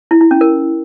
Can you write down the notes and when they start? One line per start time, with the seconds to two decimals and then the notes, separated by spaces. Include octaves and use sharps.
0.11 E4
0.21 E4
0.31 C#4
0.41 A#4